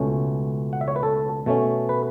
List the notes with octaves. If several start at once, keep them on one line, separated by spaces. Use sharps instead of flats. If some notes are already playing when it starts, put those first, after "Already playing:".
Already playing: C#2 B2 A3 C#4
F#5
E5
C#5
B4
A4
B2 A3 C#4
B4